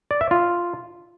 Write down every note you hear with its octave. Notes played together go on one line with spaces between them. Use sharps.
D5
E5
F4